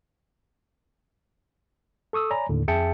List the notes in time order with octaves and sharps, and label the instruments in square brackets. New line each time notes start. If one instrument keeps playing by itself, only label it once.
[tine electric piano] A4 C#6 D#6 E6
C#5 D5 G#5 A#5 B5
D#2 A2 D3
F2 G#4 E5 G5 A5 C#7